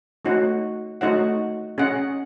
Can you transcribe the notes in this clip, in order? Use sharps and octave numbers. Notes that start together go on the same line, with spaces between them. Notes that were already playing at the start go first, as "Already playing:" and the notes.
A3 D#4 F#4 C#5 F#5
A3 D#4 F#4 C#5 F#5
C#4 G#4 D#5 F#5